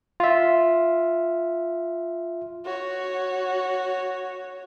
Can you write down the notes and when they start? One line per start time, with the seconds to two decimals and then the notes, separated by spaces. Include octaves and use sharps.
0.20 F4 E5
2.65 F#4 C#5